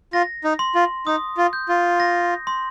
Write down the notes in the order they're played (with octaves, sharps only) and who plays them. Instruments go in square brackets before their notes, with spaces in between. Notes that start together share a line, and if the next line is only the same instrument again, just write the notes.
[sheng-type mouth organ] F4 [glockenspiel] A#6
[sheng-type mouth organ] D#4
[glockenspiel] C6
[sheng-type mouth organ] F4
[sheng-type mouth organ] D#4 [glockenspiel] D#6
[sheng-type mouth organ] F4
[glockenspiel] G6
[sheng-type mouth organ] F4
[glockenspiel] A#6
C6